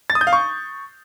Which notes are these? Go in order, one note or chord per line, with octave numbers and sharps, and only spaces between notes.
A6
D#6
G6
F5
C#6